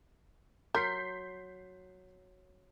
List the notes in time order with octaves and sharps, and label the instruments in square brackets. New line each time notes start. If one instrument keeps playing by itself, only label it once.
[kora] F#3 [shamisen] A#4 [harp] C6 [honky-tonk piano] G6 B6 C7